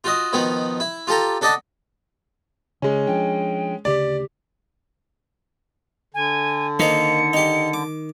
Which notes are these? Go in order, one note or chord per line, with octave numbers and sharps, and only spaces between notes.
F4 F#4 D#5
B2 D#3 F3 B3
E4
F4 G4 A4 A#5
D4 A4 D5 D#5 F#5 A5
C#3 G#3 C#4
F3 D4 G5
D2 C#3 G4 D5
D3 G#5
D#3 A#3 D#4 C5 C#7
D#4 G4
D6